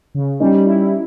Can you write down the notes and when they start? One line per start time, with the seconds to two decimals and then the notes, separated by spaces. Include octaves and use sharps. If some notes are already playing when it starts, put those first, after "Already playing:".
0.15 C#3
0.40 G3 C#4 D#4
0.66 E4